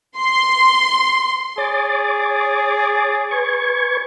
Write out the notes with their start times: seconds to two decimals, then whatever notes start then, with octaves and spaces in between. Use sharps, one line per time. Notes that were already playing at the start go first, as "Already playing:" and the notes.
0.17 C6
1.58 G#4 C#5 D6 A6
3.31 B4 C#6 G#6